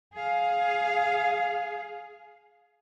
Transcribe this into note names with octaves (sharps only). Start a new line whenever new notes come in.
G#4 F5